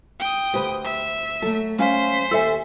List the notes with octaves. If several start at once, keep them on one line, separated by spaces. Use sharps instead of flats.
G5 D#6
D2 B2 G4 B4 C5
E5
F#3 A3 A4
C#4 C5 F5 G#5 B6
D#2 A4 C#5 E5 G#5